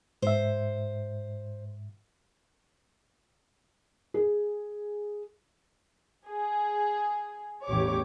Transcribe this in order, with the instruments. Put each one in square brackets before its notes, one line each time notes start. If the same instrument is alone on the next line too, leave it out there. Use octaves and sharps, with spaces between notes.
[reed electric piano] G#2 E5 [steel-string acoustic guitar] C5
[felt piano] G#4
[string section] G#4
A1 E2 G4 C#5 D6